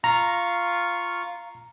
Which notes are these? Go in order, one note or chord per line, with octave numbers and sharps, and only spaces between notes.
F4 F5 A#5 C#6